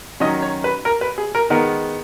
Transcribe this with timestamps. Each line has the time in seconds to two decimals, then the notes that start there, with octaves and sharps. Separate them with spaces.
0.20 D#3 F#3 C#4 D#5
0.42 C#5
0.64 B4
0.85 A#4
1.01 B4
1.18 G#4
1.35 A#4
1.50 D#3 G#3 B3 A#4